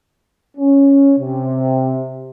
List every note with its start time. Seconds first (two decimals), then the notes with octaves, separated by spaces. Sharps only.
0.58 C#4
1.19 C3